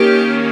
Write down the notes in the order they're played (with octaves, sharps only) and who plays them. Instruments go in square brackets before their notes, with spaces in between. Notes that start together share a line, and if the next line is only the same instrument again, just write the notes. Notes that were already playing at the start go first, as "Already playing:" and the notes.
Already playing: [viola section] D#3 A#3 C#4 G4